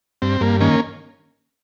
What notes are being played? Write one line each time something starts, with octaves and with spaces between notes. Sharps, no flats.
G2 C4
G2 A#3
D#3 A#3 C#4